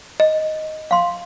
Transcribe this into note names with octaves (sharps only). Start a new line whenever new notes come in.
D#5
F5 C6